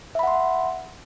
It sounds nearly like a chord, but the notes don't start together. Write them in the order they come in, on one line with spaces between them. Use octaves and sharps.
E5 B5 F#5 C6